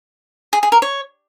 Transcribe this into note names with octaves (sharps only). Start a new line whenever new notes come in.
G#4
G#4
A#4
C#5